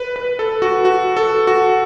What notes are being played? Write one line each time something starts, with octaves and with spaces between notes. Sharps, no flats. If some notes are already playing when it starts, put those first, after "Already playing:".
Already playing: B4
B4
A4
F#4
F#4
A4
F#4